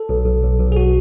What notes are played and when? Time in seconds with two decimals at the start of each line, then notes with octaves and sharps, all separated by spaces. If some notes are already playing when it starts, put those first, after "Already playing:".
Already playing: A4
0.09 B1
0.26 B1
0.43 B1
0.59 B1
0.72 G#4
0.77 F#4